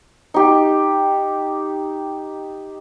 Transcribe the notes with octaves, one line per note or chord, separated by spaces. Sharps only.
D#4 G4